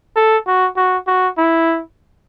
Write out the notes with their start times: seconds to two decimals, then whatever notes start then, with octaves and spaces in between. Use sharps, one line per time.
0.16 A4
0.47 F#4
0.77 F#4
1.07 F#4
1.38 E4